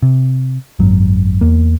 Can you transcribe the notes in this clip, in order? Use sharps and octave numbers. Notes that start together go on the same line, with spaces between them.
C3
G#1 F#2 F#3
E2 A#3